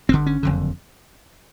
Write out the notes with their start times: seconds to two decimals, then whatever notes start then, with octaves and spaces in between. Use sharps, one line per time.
0.09 G1 G2 D3 C4
0.26 C#4
0.43 F#1 F2 D3